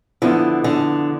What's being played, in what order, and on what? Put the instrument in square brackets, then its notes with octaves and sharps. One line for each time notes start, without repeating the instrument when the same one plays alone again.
[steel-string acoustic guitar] D3 [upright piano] F3 B3 E4
[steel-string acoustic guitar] D3